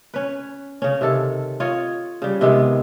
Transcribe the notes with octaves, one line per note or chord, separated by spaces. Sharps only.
C#4 B4
C#3 C#4
C3 D#3 A4
F4 C#5 D#5
C#3 G3
C3 D#3 G#3 B3